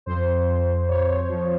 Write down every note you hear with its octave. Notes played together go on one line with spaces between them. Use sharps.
F2 C5
F2
F2 C#5
F3